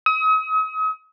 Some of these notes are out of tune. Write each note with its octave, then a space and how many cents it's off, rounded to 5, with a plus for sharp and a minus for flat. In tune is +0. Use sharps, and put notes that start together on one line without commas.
D#6 +40